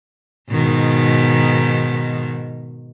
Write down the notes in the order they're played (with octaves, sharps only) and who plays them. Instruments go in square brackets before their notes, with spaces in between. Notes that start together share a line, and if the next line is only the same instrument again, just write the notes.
[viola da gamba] G#2 B2 D#3